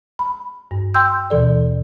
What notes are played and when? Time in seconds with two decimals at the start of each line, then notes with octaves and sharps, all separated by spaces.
0.19 B5
0.71 G2
0.94 G5 C6 E6 G6
1.30 D#2 B2 E3 A4 D5